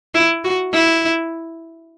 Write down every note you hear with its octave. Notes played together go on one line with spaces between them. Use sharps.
E4
F#4
E4